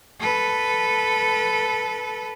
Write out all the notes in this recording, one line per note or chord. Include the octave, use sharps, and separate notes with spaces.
A4 B4